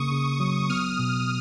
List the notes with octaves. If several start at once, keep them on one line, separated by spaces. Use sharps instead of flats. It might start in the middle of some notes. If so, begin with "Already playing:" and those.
Already playing: C#3 A#3 C#6 D#6
C#3
F#3
B3 D#6 F6
B2